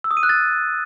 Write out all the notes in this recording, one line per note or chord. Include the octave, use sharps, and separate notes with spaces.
E6
D#6
D#7
F#6
A6